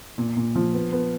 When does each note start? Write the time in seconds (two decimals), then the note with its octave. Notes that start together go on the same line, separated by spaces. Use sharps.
0.18 A#2
0.37 A#2
0.55 F3
0.73 B3
0.92 B3